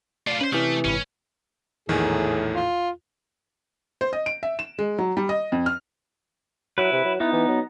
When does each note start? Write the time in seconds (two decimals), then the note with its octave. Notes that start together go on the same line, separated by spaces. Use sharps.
0.27 A3 F4 D5 F5
0.41 C#4 B4 C5
0.52 C3 E3 A3 D#6 F6 G6
0.85 G1 A2 C#4 B4
1.89 A#1 E2 A2 D#3 G#4
2.55 F4
4.01 C5
4.13 D#5
4.26 D7
4.43 E5
4.59 E7
4.79 G#3
4.98 F#3
5.17 G3
5.29 D#5
5.52 F2
5.66 F6
6.78 F#3 E4 B4
6.92 C3
7.05 F#3
7.20 B3 D#4 E4
7.33 E3
7.48 F#3